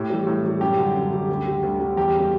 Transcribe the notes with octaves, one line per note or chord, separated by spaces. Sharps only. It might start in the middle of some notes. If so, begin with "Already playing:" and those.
Already playing: A2 G4
E3 G3
A2
E3 G3
F#2 G4
D3 G3
F#2
D3 G3
D2
D3 G3
D2
D3 G3
E2 G4
C#3 G3